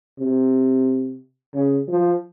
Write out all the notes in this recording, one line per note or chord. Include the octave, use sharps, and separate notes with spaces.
C3
C#3
F3